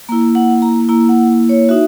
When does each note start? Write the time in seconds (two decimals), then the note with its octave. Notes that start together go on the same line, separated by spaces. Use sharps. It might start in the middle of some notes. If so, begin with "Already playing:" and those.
0.09 A#3 A#5
0.12 E4
0.35 F#5
0.62 A#5
0.89 A#3 E4 A#5
1.09 F#5
1.49 C#5
1.69 D#4 F#4 E5